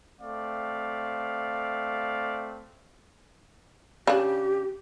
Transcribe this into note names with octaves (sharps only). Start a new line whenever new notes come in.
A3 C4 D5 F5
C#3 D4 G4